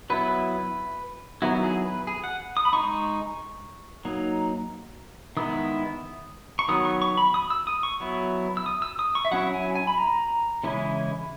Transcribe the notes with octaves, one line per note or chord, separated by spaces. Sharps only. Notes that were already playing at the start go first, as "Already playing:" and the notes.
F#3 B3 E4 B4
D#3 F#3 B3 E4 F#4
G#4
B4
G#4
F#5
D#6
B5
G#3 D#4 C#6
F#3 A#3 D#4
D#3 G#3 B3 E4 D#6
C#6
D#3 F#3 B3 D#6
C#6
C#6
B5
D#6
E6
D#6
C#6
F#3 B3 E4
E6
D#6
E6
D#6
C#6
E5
F#3 C#4 E4 F#5
G#5
G#5
B5
A#5
C#3 E3 G#3 C#4 E4